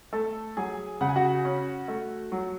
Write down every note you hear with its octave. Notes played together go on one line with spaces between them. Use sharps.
A3 A4 A5
F#3 G#4 G#5
C#3 F#5
G#5
F#4 F#5
C#4
A3
F#3